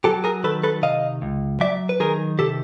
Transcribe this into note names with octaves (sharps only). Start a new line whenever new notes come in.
F#3 G4 A4
G#4 A#4
D#3 A4 B4
A4 B4
C3 D#5 F5
C#2
F#3 D5 E5
B4
D#3 G#4 A#4
C3 G4 A4